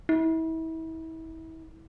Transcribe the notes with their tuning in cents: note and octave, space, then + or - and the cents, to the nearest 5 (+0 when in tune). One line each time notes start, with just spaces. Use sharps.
E4 -35